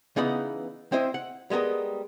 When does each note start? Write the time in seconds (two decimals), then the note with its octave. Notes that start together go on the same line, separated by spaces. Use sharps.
0.16 C#3 E3 B3 D#4 F#5 B5
0.92 C4 E4 C5 D#5 E5
1.14 F#5
1.50 G3 G#3 B3 A#4 D#5